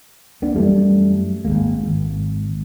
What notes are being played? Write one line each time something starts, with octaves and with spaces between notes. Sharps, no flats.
A#3 B3 D4
F#2 E3 G3 A3
G#1 F#2 G#3 A#3
G#1